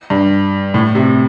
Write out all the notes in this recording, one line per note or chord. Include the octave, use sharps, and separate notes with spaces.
G2
A2
C3